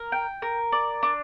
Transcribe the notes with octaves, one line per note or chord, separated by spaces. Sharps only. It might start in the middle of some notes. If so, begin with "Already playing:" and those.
Already playing: A#4
G5
A#4
D5
D4